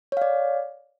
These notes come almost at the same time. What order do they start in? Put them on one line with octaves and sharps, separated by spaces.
C#5 F5 D5